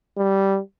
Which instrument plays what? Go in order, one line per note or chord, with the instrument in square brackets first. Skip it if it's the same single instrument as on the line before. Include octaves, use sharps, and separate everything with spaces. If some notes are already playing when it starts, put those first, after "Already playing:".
[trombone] G3